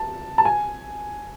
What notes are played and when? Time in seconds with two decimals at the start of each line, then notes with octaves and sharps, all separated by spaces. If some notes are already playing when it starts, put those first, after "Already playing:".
Already playing: A5
0.38 A5
0.45 G#5